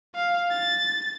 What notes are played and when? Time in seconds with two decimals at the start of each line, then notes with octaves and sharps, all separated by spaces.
0.15 F5
0.51 A6